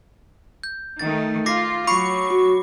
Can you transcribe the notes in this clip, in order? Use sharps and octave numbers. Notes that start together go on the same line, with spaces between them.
G6
D#3 A3 A6
F4 D6 A#6 C7
F#3 B5 C#6 C7
F#4